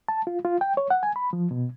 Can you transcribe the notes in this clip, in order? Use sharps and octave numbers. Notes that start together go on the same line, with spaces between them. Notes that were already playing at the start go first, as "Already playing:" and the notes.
A5
F4
F4
G5
C#5
F#5
G#5
B5
F3
B2